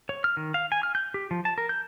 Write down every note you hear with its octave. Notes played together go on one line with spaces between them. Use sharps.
C#5
F6
D#3
F5
G#5
F6
G6
G4
F3
A5
A#4
G6